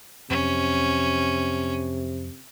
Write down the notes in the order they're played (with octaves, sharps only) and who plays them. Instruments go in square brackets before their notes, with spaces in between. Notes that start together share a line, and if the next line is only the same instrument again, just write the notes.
[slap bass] F2 F#3 [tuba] C3 [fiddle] C#4